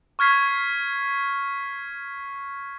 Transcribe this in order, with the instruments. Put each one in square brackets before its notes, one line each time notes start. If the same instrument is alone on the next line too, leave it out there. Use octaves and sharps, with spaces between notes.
[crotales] C#6 F6 G#6 B6 C7